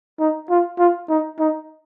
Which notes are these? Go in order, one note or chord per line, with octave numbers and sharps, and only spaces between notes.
D#4
F4
F4
D#4
D#4